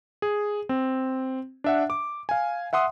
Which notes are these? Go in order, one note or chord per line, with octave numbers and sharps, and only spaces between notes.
G#4
C4
D4 E5 F#5
D6
F5 G#5
E5 F#5 C6 D#6